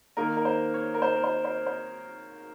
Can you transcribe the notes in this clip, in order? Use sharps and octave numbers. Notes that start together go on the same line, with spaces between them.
D#3 A#3 D#4 A#4
A#4
C5
C#5
A#4
C5
A#4
C5
C5
C5